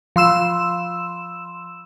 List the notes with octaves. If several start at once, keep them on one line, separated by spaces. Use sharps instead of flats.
F3 C6 E6 E7